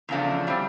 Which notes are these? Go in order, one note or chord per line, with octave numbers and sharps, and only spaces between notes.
E2 C#3 F3 A3 D4
B2 G3 C4